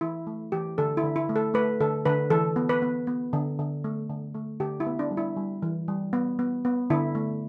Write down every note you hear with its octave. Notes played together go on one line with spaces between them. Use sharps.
E3 E4
A3
E3 G4
D3 A4
E4
D3
E4
A3
A4
A3 B4
D3 A4
D3 B4
E3 A4
B3
B4
B3
B3
D3
D3
A3
D3
A3
D3 G4
E4
B3
D4
G3
E4
G3
E3
G3
B3
B3
B3
D3 E4
A3